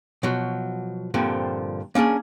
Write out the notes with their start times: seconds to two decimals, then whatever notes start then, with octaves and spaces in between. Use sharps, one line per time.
0.23 B2 F3 F#3
1.14 G2 A#2 D3 F3 C4
1.95 A#3 C#4 D4 G#4